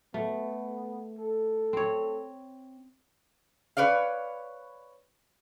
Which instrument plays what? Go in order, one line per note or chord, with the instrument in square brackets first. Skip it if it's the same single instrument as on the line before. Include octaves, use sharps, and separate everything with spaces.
[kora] A3 [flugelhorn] B3
[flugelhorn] A4
[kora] C4 C#5
[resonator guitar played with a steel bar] B4 C#5 D5 F5